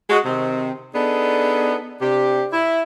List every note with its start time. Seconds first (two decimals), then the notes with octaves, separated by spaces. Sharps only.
0.10 G#3 F#4
0.25 C3 D#3 C4
0.94 B3 D4 D#4 G#4 A4
2.01 C3 D4 G4
2.52 E4